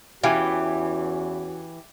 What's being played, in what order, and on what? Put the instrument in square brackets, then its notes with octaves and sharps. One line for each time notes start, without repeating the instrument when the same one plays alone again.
[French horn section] E2 C#4 F#4 [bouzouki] E3 [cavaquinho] G4 [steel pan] F5 G#5